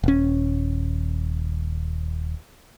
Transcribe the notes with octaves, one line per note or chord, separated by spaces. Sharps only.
D#1 C#4